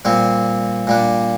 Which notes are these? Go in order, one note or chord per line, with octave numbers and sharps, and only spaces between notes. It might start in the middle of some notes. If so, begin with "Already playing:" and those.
A#2 G3 C4
A#2 G3 D4